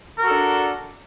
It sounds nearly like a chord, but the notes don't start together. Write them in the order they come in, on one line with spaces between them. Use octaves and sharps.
A#4 F#4 A4 D4